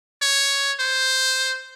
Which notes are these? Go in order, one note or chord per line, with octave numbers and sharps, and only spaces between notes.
C#5
C5